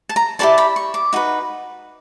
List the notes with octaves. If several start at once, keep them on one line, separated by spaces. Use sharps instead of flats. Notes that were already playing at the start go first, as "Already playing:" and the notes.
A5
A#5
E4 G4 A#4 D5 A5
B5
C#6
D6
D#4 F#4 B4